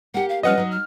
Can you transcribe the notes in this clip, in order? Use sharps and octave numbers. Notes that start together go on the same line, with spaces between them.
A#3 G4 F#5
F5
F3 G3 C#4 B4 D#5 F#5 F6
F#3 D#4
F6